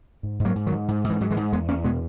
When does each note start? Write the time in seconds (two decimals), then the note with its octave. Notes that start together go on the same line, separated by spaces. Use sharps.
0.23 G#2
0.40 G#2
0.45 F#3 A#3
0.55 G#2
0.67 D#3 F#3
0.72 G#2
0.88 G#2
1.04 G#2
1.09 E3
1.20 G#2 F#3
1.31 E3 G#3
1.37 G#2
1.52 E2 G#3 B3
1.68 E2 A#3 C#4
1.84 B2 G#3 B3